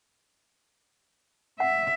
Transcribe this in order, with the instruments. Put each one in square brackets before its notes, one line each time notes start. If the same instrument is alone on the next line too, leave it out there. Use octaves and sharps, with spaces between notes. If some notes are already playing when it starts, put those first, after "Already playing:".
[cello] E5 [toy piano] F#5